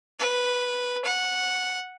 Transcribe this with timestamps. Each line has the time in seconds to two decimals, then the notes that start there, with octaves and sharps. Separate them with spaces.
0.19 B4
1.05 F#5